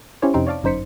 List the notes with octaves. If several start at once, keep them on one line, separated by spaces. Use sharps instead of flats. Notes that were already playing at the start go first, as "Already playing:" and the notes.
C#4 E4 G4 C5 C#5
F2 C3 C4 D#4 C6 D7
C#5 D5 F5 A5 D6
G1 F#2 D#4 C5 B6 C#7